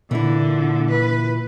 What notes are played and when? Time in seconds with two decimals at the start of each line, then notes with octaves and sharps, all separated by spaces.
0.11 A#2 D3 E3 E4
0.90 B4